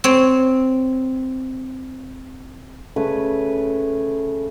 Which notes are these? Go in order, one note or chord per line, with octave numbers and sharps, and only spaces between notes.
C4 C#5
C#3 A3 B4